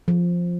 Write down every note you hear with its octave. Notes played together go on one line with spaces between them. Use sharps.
F3